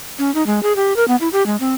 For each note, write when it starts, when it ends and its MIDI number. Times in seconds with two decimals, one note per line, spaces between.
0.19 0.33 61
0.35 0.45 63
0.46 0.62 56
0.63 0.75 68
0.76 0.96 67
0.96 1.07 70
1.08 1.16 59
1.21 1.28 64
1.33 1.45 67
1.46 1.56 56
1.60 1.75 60